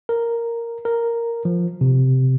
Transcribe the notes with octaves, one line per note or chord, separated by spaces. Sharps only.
A#4
A#4
F3
C3